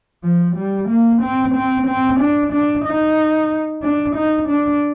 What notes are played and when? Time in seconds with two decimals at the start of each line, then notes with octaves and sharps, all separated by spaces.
0.24 F3
0.56 G3
0.89 A#3
1.22 C4
1.55 C4
1.87 C4
2.20 D4
2.53 D4
2.86 D#4
3.83 D4
4.16 D#4
4.49 D4